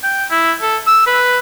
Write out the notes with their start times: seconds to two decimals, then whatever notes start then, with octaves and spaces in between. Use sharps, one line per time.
0.03 G5
0.31 E4
0.62 A4
0.87 E6
1.07 B4